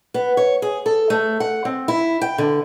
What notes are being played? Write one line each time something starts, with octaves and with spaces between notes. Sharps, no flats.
B3
C#5
G#4
A4
A3
F#5
C4
E4
G5
D3